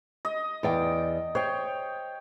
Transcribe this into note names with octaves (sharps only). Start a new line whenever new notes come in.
D#5
E2 D5 G5
C5 C#5 G5